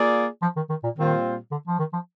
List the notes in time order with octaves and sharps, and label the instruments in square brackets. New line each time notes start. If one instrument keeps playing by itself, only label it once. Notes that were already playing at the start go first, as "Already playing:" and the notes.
Already playing: [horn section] A#3 F4 G#4 D5
[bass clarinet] F3
D#3
D#3
A#2
[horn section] A#2 G3 C4 F4 C5 [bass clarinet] D#3
[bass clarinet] D3
F3
D#3
F3